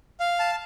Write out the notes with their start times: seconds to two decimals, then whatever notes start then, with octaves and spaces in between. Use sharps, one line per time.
0.20 F5
0.39 A5